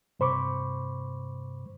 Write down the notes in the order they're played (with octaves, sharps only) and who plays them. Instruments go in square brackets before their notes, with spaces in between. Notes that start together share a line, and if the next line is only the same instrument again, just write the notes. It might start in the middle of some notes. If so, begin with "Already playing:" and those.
[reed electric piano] G2 C3 C5 B5 C#6 D6